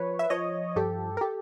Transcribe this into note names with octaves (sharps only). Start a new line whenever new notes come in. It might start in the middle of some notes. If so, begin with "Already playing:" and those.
Already playing: F3 B4 C#5
E5
F3 C#5 D#5
G2 G4 A4
A#4
G4 A4